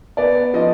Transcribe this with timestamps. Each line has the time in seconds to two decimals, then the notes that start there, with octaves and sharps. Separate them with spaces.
0.17 B3 D5
0.53 F3 D#5